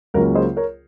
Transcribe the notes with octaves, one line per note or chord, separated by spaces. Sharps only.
C#2 C#3 F#3 A#3 C#4 A#4
G#4 C5
A#4 C#5